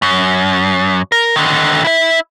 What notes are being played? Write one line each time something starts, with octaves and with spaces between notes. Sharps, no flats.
F#2
A#4
D3 D#3
E4 E5